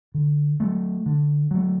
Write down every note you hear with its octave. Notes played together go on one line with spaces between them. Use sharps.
D3
F#3 A3
D3
F#3 A3